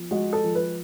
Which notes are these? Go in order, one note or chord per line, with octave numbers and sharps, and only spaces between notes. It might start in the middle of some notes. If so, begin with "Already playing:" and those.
Already playing: F3 B3
G#3 F#4
A4
F3
B4